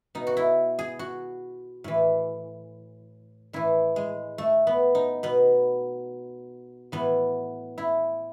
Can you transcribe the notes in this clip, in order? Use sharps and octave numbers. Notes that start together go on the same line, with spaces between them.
B2 D#4
F#4
E4
G#4
F#4
A2 E3
A2 E3 E4
G#3
A3
B3
D#4
B2 B3
A2 E3 B3
E4